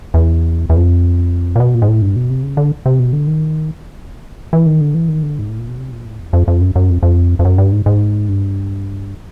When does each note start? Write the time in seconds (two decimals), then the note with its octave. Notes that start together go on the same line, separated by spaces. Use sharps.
0.14 E2
0.70 E2
0.76 F2
1.56 A#2
1.60 B2
1.74 A#2
1.82 G#2
1.88 A2
2.02 G2
2.16 B2
2.30 C3
2.43 C#3
2.57 D3
2.86 C3
2.99 B2
3.13 D3
3.27 D#3
4.53 E3
4.66 D#3
4.81 D3
4.94 E3
5.08 D#3
5.23 D3
5.39 G#2
5.49 A2
5.58 A#2
5.69 B2
5.78 C3
5.91 A#2
6.06 A2
6.20 E2
6.33 F2
6.48 F2
6.61 F#2
6.76 F#2
6.90 F2
7.03 F2
7.39 F2
7.45 F#2
7.58 G2
7.72 G#2
7.86 G#2
8.29 G2